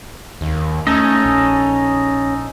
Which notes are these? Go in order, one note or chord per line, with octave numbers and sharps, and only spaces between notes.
D#2
A3 C#4 D#4 A4 D#5
A#1